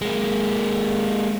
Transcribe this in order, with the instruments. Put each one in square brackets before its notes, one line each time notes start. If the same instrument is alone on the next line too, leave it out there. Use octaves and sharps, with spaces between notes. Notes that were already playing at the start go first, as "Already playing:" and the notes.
[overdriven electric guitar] G#3 A#3